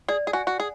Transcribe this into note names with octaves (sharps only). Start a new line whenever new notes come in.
G#4 D5
G#4
F#4 G#5
F#4
G#4